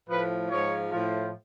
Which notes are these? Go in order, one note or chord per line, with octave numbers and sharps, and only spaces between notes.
A2 F3 B4
G#2 F3 C#5
A2 F3